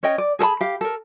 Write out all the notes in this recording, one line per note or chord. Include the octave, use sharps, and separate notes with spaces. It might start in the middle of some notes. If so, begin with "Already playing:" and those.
C#4 C#5 D#5 G5
D5
G#4 A4 A5 B5
G4 F5
A4 A#4